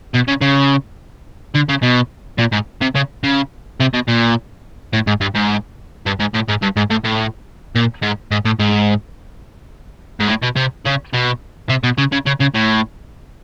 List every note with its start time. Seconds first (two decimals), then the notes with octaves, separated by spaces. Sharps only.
0.14 B2
0.28 C#3
0.41 C#3
1.54 D3
1.69 C#3
1.83 B2
2.39 A#2
2.53 G#2
2.82 C3
2.95 C#3
3.23 C#3
3.80 C3
3.94 B2
4.08 A#2
4.93 A2
5.07 G#2
5.21 G2
5.35 G#2
6.06 G2
6.20 G#2
6.34 A2
6.48 G#2
6.62 G2
6.76 G#2
6.91 A2
7.05 A2
7.75 A#2
8.03 G#2
8.31 G#2
8.45 A2
8.59 G#2
10.20 G#2
10.29 A2
10.43 B2
10.56 C3
10.85 C#3
11.13 B2
11.69 C3
11.84 B2
11.98 C#3
12.12 C#3
12.26 C#3
12.40 C#3
12.54 A2